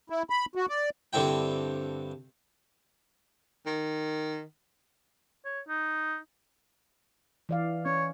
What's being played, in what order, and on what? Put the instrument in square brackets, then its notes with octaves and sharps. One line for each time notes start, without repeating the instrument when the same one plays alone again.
[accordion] E4
B5
F#4
D5
[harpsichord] G2 D3 C4 E4 G5
[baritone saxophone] D#3
[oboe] C#5
D#4
[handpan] E3 D5 F5
[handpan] C#4 [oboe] C#5